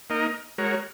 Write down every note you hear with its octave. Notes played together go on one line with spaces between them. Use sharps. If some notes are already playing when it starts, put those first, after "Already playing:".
A#3 D#4 A#4 D#5
G#3 F#4 A#4 C#5